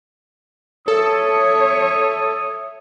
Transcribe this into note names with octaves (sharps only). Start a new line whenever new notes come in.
A4 C#5 E5 D#6